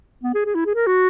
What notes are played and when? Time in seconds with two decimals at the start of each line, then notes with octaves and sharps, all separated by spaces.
0.23 B3
0.34 G#4
0.45 G#4
0.55 E4
0.66 G#4
0.75 A#4
0.87 F#4